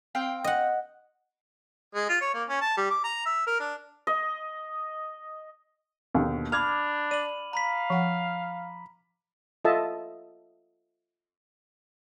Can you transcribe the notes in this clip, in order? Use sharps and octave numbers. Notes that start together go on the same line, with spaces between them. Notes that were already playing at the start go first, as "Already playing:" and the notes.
C4 F5 G5
D#5 F#5
G#3
F4
C#5
A#3
C#4
A5
G3
D6
A#5
E5
A#4
D4
D#5
D#2 B2 D3
D4 B5 D6 F6 G#6 F7
D5 D#7 F#7
F5 A#5 B5 B6
F3 F#5
F4 A4 D#5 E5 A5